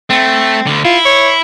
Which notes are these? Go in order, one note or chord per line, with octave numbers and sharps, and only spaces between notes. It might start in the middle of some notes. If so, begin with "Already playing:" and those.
A3 C4
D2 D3
E4 F4
C#5